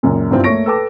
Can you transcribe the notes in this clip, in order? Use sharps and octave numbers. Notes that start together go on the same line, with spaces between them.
C#2 F#2 A#2
G2 F3 B3 C4 E4 F4
A3 A#3 C#5 C#6 A#6 D7
A4 B4 G5 A5 D6